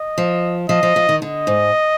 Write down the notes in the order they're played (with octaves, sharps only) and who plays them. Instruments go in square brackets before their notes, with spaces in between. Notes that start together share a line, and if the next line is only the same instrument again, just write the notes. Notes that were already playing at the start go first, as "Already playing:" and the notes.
Already playing: [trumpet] D#5
[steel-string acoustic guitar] F3
[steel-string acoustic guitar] F3 [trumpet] D#5
[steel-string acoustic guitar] F3
F3
D#3
[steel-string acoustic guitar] D3 [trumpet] D#5
[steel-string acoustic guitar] G#2